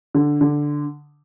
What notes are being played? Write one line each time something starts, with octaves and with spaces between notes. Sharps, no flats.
D3
D3